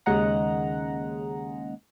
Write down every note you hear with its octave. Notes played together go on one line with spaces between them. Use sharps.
D#2 C#3 G#3 D#5 F#5 A#5